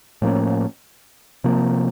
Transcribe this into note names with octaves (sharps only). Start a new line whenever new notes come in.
A2 F3 A#3 C#4
C3 F3 A#3